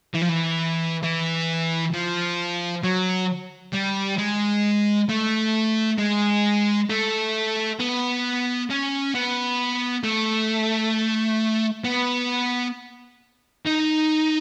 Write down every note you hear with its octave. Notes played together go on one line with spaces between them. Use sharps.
E3
F3
E3
E3
F3
F#3
G3
G#3
A3
G#3
A3
B3
C#4
B3
A3
B3
D#4